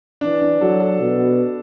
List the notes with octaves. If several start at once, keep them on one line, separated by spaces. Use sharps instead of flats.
E3 D4
D4
F#3 A4
A4
B2